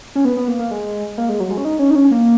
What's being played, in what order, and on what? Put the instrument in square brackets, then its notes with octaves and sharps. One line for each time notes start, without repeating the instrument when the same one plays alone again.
[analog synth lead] C#4
B3
B3
A#3
A#3
G#3
A#3
G#3
F#3
G#3
C#4
D#4
C#4
D#4
C#4
A#3